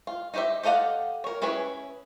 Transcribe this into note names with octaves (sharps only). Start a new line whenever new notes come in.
F4
D#4 E4 G4 C5 E5
G4 A4 D#5 F5 F#5
A#4 C#5
C#4 E4 G#4 B4 C#5